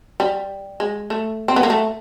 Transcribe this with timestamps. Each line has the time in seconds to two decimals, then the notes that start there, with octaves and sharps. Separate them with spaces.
0.20 G3
0.80 G#3
1.10 A3
1.48 C4
1.56 B3
1.63 A#3
1.70 A3